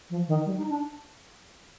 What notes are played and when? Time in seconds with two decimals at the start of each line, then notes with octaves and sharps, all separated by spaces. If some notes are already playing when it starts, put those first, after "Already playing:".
0.10 F3
0.28 D#3
0.46 G3
0.58 D#4
0.70 D4